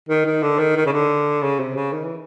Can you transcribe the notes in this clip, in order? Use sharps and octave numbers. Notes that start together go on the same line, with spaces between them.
D#3
D#3
D3
D#3
D#3
C#3
D3
C#3
C3
C#3
D#3
E3